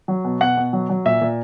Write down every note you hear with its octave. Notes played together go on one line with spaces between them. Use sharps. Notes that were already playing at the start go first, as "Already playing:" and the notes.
F#3
B2
B2 F#5
B2
F#3
F#3
A#2 E5
A#2